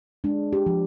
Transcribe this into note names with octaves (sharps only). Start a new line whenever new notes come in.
G#3 D4
G4
F3